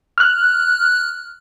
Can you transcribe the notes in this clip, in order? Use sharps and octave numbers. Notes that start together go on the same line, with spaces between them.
F6 F#6